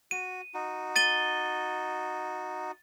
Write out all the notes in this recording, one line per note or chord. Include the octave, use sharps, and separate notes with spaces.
F#4 D#7
D#4 F#4
A6 D#7 G7